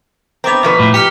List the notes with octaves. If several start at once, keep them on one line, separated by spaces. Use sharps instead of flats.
B3 C4 A#5 D6 F7
B2 F3 B4
A2
G4 F6 B6 C#7